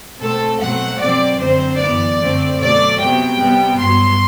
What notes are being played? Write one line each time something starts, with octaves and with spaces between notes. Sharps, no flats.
B2 A3 C4 A4
B2 F#3 A3 C4 F#5
B2 F#3 C4 D5
F#2 D3 F#3 C4 C5
F#2 E3 B3 D5
F#2 D3 A3 C4
B2 F#3 A3 D5
C3 F#3 B3 G5
C3 G3 B3
G2 F#3 B3 C6